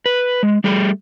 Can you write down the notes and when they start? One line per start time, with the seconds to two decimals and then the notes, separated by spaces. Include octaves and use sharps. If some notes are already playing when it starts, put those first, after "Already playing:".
0.06 B4
0.43 G#3
0.64 G3 A3 G#4 G5